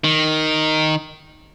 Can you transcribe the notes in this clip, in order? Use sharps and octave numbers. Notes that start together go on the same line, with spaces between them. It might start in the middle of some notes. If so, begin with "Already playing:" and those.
D#3